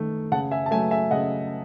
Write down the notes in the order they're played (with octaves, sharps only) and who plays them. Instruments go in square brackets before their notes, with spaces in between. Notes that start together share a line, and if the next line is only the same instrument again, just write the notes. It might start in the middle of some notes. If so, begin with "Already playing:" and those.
Already playing: [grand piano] D#3 A3
C#3 F#5 A5
E5 G#5
A5
A3 E5 G#5
F#3
E5 G#5
C#3 D#5 F#5